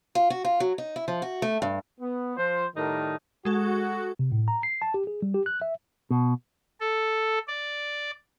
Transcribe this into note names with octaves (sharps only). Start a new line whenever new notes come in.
F4
F#4
F4
F#3
D#4
E4
F3
F#4
A3
G2
B3
F3 C5
A2 D#3 G3 D#4 A#4 A5
G#3 F#4 A4
C3
A2
A#5
C7
A5
G4
G#4
G3
G4
F#6
E5
B2
A4
D5